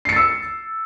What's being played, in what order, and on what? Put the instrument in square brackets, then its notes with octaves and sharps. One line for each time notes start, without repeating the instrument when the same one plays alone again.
[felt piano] C7
C#7
A6
E6